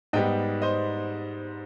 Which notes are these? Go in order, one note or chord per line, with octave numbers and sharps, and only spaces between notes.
G#2 G3 B3 D#5 G5
C5 D#5